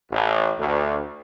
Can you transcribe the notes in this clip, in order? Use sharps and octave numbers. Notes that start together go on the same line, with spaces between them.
A1
D2